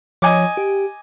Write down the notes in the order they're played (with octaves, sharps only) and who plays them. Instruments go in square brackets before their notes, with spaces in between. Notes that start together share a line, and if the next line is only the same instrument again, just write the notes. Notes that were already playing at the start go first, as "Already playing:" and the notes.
[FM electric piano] F3 C#5 [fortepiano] D#5 G#5 D6
[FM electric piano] G4